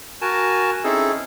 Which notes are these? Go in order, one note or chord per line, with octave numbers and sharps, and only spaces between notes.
F#4 A#4 G#5 A5
C4 C#4 D#4 E4 G#4 A4